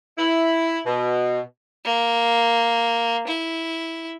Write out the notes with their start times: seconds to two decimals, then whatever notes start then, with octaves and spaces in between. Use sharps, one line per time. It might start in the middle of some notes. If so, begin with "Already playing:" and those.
0.18 E4
0.86 B2
1.85 A#3
3.28 E4